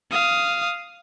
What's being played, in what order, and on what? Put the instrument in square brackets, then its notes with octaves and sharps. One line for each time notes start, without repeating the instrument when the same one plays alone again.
[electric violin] F5 D#6